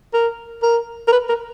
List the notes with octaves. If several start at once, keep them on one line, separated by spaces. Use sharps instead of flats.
A#4
A#4
A#4
B4
A#4